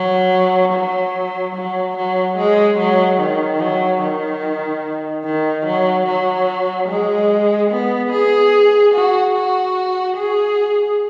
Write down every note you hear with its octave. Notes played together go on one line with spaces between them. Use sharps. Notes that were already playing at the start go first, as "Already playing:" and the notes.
Already playing: F#3
F#3
F#3
F#3
G#3
F#3
D#3
F#3
D#3
D#3
F#3
F#3
G#3
B3
G#4
F#4
F#4
G#4